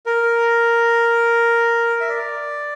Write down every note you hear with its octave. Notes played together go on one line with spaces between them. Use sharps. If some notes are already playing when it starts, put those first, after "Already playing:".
A#4
E5
D5